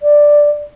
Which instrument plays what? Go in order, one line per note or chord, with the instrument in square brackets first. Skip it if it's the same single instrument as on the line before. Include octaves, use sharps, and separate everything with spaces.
[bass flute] D5